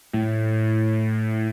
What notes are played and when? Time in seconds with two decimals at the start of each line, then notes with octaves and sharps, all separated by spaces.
0.13 A2